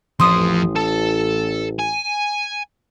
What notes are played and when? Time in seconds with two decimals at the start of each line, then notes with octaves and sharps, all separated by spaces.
0.20 A1 F2 F3 C6 D#6
0.76 A4 A5
1.79 G#5